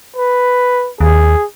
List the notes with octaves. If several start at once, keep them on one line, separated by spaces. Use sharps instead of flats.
B4
D#2 G#4